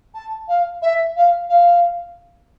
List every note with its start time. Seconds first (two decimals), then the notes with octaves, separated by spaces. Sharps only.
0.14 A5
0.48 F5
0.82 E5
1.16 F5
1.49 F5